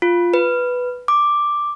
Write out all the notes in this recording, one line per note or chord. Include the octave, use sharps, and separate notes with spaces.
F4
B4
D6